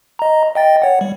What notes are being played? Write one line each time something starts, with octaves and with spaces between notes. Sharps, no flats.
D#5 A#5
D#5 G5 A6
C#5 F#5
G3